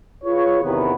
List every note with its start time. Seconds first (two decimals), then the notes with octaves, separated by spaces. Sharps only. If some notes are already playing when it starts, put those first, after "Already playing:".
0.24 F4 G#4 B4 C#5
0.62 E2 C3 D#3 B3